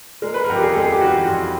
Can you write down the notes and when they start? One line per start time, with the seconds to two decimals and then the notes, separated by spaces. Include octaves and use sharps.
0.22 G#3 A#4
0.34 B4
0.44 A#4
0.49 F2
0.55 G4
0.62 G#4
0.73 G#3 A4
0.82 G#4
0.92 G4
1.01 E3 F#4
1.27 F2